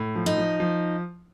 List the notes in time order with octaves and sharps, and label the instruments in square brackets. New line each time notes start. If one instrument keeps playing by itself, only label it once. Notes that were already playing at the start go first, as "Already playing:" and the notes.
Already playing: [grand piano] A2
F3
[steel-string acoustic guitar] D#4
[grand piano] F3
F3